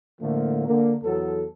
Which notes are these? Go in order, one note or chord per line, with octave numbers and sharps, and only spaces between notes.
A2 D3 F3 A3 A#3
D3 A#3
E2 F#3 B3 A4